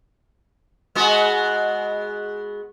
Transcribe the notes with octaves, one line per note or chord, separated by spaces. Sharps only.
G#3 B3 F#4